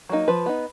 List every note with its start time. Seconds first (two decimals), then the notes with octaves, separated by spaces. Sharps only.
0.09 F#3 A#3 D#4
0.28 F3 B4
0.46 B3 D#4